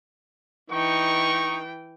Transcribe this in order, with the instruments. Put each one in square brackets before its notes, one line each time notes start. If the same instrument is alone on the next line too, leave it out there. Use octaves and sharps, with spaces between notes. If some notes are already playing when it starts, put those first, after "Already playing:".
[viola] E3 G5 [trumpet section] D#4 C#6